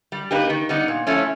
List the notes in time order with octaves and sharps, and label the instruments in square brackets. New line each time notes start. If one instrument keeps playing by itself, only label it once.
[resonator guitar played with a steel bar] G3
A#3 D#4 G4 B4
D#3
G3 B3 D#4
A#2
F3 A3 C#4 E4